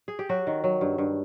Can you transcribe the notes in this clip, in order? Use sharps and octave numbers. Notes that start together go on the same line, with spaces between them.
G#4
G4
F#3 F#4
D#3
F#3
G2
G2